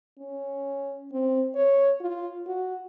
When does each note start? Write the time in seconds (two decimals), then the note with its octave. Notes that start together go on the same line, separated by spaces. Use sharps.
0.19 C#4
1.13 C4
1.55 C#5
2.01 F4
2.47 F#4